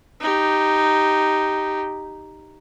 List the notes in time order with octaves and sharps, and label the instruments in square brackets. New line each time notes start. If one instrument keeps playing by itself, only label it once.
[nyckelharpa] D#4 G4